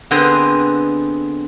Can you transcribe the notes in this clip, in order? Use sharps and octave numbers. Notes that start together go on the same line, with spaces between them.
D3 B3 C4 G#4 D#5 G5